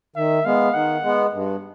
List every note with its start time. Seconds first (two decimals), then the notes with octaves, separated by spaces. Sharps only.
0.16 D#3 E5
0.45 G#3 B3 F5
0.74 D#3 F#5
1.04 G#3 B3
1.33 G2